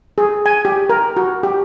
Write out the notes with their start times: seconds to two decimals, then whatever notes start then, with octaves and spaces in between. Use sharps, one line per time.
0.18 G#4
0.46 G#5
0.65 G4
0.89 A#4
1.17 F#4
1.43 G4